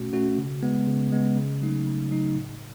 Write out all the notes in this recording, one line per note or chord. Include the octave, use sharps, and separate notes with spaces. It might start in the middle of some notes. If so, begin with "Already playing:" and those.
Already playing: B2 A3 C#4 F#4
A3 C#4 F#4
C#3
G#3 B3
C#3
G#3 B3
C#3
F#3 A3 D#4
C#3
F#3 A3 D#4
A2